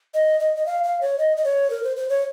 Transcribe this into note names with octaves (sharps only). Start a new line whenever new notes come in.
D#5
D#5
D#5
F5
F5
C#5
D#5
D#5
C#5
A#4
C5
C5
C#5